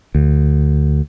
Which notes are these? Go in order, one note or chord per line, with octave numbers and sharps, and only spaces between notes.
D2